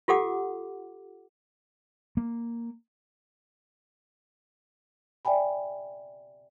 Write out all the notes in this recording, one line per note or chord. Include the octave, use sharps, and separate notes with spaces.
F4 G4 A4 F#5 D6
A#3
D5 E5 G5 G#5 B5